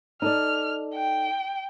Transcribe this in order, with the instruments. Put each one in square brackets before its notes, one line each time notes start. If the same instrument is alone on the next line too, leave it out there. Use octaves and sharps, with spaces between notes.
[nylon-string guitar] D#4 A4 D5 [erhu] F6
[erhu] G5